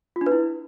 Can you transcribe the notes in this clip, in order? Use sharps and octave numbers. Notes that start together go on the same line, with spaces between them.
F4
D4
B4
E4